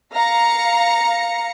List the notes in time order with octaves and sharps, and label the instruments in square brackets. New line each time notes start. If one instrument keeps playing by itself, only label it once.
[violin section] F5 A#5 A#6 C#7